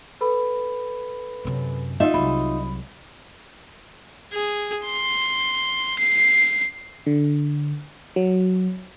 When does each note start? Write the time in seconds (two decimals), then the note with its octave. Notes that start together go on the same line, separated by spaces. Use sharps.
0.21 A4 B4 B5
1.45 F#2 C3
2.00 D#3 D#4 F4 E5
2.14 C2 F#3 B5
4.33 G#4
4.85 C6
5.99 C7
7.06 D3
8.16 F#3